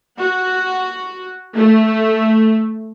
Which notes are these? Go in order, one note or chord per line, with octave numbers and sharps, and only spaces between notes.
F#4
A3